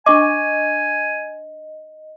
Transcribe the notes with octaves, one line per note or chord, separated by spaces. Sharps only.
D4 D#5 G#5 C#6 D6